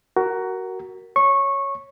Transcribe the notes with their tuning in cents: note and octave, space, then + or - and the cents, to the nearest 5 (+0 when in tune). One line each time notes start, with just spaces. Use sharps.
F#4 +15 A#4 +0
C#5 +0 C#6 -15